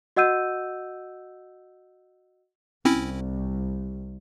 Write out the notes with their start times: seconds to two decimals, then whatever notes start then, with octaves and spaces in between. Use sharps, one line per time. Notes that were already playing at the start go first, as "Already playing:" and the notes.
0.16 F#4 D#5 F#5 E6 G6 D#7
2.85 C2 C4 C#4 E4